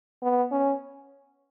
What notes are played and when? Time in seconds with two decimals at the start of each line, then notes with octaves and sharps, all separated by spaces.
0.22 B3
0.52 C#4